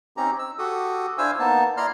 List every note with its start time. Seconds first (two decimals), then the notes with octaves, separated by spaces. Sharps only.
0.17 C4 C#4 D#4 G4 A#5
0.39 E6
0.58 F#4 G4 A4 D#6
1.18 D4 E4 C5 F5 G#5 E6
1.39 A#3 B3 D#4 A5
1.77 E4 D5 A#5 C6 F6